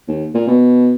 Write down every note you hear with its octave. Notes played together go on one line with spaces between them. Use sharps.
D#2
A#2
B2